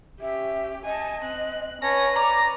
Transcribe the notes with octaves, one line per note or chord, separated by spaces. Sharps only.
C#4 G4 E5
D#5 G#5 A5
C4 F#6
C#4 B4 C#5 A5 A#6
D5 A#5 D6